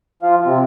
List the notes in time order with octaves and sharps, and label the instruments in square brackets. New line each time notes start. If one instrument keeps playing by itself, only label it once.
[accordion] F3 F4
C3 C4